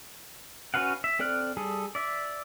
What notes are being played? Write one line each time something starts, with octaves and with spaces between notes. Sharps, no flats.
C#4 F#4 B4 F5 F#5
E5
C4 A4 D5 F6 F#6
G3 G#4 A4
D5 E5